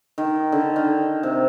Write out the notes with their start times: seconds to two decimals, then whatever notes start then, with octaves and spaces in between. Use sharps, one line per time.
0.18 D#3
0.52 D3
0.76 D#3
1.23 C3